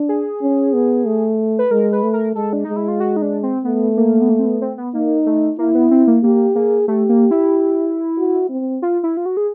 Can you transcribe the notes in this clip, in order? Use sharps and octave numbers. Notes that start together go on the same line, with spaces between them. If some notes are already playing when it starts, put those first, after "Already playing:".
Already playing: D4
G#4
C#4
B3
A3
B4
G#3 A#4
B4
A3
A#4
G#3 A4
D4
G#3 D#4
E4
F4
F#4
D#4
D4
C4
A3 B3
A#3
B3
A#3
C4
B3
C4
B3
A#3 D#4
A3
A#3 E4
B3
C4
A#3
A#3 G4
A#3 G#4
A3 G4
A#3
E4
F#4
C4
F4
E4
F4
F#4
G#4